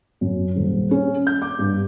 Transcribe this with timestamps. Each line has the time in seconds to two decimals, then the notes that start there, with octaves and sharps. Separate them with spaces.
0.21 F#2
0.56 D#1
0.91 C#4
1.27 G6
1.42 D6
1.59 G2